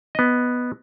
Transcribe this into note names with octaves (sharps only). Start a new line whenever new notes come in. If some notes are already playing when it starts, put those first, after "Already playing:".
B3 D#5